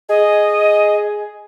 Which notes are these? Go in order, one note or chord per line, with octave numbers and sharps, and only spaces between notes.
G#4 D#5